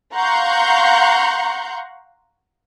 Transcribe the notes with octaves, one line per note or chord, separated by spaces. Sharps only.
F5 F#5 A#5 C6 C#6 G6